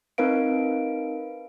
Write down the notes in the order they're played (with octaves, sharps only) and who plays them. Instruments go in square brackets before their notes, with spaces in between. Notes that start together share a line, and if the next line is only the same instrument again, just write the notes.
[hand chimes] C4 D#4 A#4 B4 F5 D7